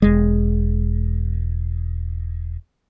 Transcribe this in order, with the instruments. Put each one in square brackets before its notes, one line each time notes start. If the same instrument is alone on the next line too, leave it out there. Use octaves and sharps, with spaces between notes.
[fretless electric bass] E1 G#3